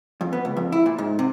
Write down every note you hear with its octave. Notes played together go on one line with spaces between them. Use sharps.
F2
B3
C#2
F2
E4
A#2
G#2
C3